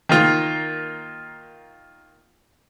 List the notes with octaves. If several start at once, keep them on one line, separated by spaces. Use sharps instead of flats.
D#3 A#3 F4